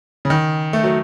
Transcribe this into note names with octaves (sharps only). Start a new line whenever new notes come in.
C#3
D#3
A3
F#3